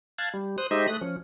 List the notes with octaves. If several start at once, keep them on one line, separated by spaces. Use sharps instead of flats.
F5 A5 F#6 G#6
G3
C5 D#6 F#6
G#3 D#4 G4 C5 D#5 E5
A3 D#6 F#6
F3 C#4